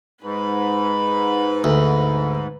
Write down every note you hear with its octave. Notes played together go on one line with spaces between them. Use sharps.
G#2 B4 B5
D2